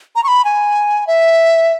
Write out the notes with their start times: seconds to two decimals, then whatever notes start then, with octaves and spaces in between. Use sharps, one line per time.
0.16 A#5
0.24 C#6
0.28 B5
0.45 G#5
1.07 E5